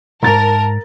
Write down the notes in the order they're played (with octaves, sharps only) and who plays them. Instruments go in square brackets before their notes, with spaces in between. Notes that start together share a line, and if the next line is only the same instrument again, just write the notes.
[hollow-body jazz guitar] C2 G#2 [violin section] A#4 [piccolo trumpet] A5 [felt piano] A#5 A6